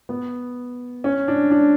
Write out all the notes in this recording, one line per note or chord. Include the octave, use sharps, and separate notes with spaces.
B3
C#4
D4
D4